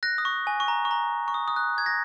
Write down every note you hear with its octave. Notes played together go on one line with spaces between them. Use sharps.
F#6 A#6
D#6
C#6
G#5
C#6
A#5
C#6
A#5
C#6
D#6
D#6
F#6
G#6
A#6